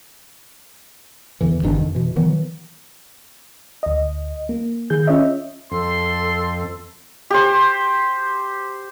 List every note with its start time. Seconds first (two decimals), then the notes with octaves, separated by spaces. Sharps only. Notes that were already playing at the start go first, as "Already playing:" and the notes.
1.41 E2 D3 E3
1.63 G1 C3 D#3 D4
1.80 F2
1.95 B2 E3
2.16 D#3 E3 F#3 B3
3.83 D2 D#5
4.49 A#3
4.90 D#3 G#4 G6
5.07 C#4 F4 C#5 D#5 E5
5.71 F2 A4 C6
7.30 G4 C5